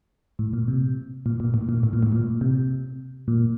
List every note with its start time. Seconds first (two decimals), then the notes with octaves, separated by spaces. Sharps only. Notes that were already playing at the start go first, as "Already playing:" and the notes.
0.39 A2
0.53 A#2
0.68 C3
1.26 A#2
1.40 A#2
1.54 A2
1.69 A#2
1.83 A2
1.93 A#2
2.03 A2
2.12 A#2
2.41 C3
3.28 A#2